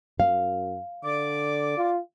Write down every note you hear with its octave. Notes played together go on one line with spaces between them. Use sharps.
F#2 F5
D3 D5 D6
F4